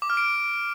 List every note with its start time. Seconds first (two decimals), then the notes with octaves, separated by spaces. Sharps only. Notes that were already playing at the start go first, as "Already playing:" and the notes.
0.02 D6
0.10 F6
0.17 D7